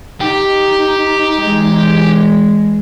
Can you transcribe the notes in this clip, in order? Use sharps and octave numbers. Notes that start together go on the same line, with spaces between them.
D#4 G4
E3 G#3